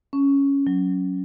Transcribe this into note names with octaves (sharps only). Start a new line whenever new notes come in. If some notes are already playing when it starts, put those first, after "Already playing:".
C#4
F#3